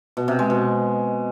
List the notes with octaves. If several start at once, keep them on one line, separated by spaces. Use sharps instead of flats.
B2
C3
G#3
B2